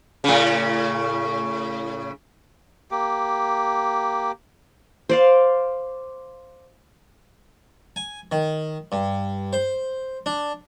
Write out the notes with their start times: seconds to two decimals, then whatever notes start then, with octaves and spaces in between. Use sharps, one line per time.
0.24 A2 C#3
2.91 A#3 G4
5.09 C5 D5 F5
7.96 G#5
8.32 D#3
8.92 G2
9.53 C5
10.26 D4